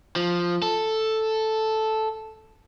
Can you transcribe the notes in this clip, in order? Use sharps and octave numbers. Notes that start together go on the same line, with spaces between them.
F3
A4